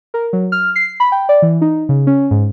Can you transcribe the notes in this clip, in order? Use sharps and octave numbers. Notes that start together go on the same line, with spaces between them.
A#4
F#3
F6
C7
B5
G5
D5
E3
D#4
C#3
C#4
G#2